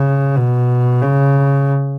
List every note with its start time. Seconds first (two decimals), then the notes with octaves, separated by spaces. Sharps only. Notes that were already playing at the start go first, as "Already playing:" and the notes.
Already playing: C#3
0.36 B2
1.02 C#3